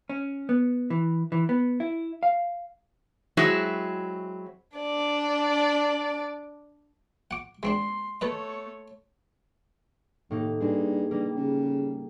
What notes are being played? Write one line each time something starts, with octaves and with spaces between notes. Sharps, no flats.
C#4
B3
E3
E3
B3
E4
F5
F#3 G#3 C4 E4 F#4 G#4
D4 D5
F#5 D6
G#3 C4 D4 C6
A3 A4 B4 C#5 D#5
D#2 A2 A#3 D#4
G2 C4 G#4
G2 G3 A#3
C#3